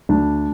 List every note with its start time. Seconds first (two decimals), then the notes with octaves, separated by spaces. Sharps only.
0.09 D2 D4